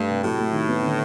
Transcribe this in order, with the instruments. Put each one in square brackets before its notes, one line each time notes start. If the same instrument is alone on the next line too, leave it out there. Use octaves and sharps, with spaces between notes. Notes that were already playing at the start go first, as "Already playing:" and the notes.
Already playing: [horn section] G2 [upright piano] A3
[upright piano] C3
[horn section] A2 [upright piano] F#3
[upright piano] A3
D#3
B3
D3